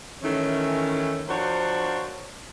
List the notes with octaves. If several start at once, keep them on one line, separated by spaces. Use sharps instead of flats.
D#3 E3 A3 C#4
F3 D4 F#4 A#4 C5 C#5